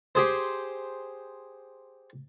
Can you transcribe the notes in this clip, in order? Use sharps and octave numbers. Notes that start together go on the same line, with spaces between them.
G4 G#4 C5